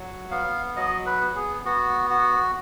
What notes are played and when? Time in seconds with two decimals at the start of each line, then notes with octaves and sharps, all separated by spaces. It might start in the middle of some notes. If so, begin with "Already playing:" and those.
Already playing: F#3
0.31 B3 F5
0.76 F#3 D#5
1.06 B4
1.20 B3
1.35 G#4
1.65 B3 F#4
2.10 F#4